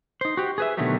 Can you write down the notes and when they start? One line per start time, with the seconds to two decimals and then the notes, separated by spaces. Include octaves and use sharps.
0.21 D#4 C5
0.37 F#4 G4
0.58 G#4 B4 E5
0.77 B2 D3 D#3 F#3 A3 G4